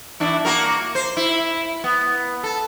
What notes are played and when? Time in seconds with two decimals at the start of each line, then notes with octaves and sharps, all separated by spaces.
0.20 E2 D4 E4
0.45 A#3 F#4 A#4
0.95 C5
1.17 E4
1.84 B3
2.43 A4